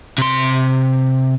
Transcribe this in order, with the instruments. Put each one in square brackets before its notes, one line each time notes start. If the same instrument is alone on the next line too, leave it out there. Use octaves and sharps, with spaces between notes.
[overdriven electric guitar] C3 C6